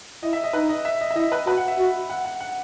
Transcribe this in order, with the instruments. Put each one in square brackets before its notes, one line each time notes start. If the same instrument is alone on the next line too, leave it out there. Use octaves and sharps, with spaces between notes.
[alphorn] E4 [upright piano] D#5
[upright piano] E5
D#5
[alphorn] D#4 [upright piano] B4
[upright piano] D#5
E5
D#5
E5
[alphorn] E4 [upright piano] D#5
[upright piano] B4
[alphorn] F#4 [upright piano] B4
[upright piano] F#5
E5
[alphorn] F#4
[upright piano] F#5
F#5
F#5